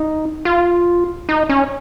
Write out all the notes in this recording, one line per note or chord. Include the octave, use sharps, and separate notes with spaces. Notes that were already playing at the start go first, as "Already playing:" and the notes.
Already playing: D#4
F4
D#4
C#4